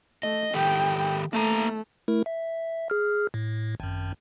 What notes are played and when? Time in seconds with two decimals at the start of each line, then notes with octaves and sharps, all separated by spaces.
0.23 A3 D#5
0.54 D#3 G4 A4 G5
1.33 A3 A#3 E5 A#5
2.08 A3 E4 A#4
2.26 E5
2.90 G#4 F6
3.34 A2
3.80 G#1 F#2